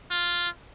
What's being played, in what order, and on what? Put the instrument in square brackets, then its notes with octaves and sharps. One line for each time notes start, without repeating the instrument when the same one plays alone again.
[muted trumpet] F4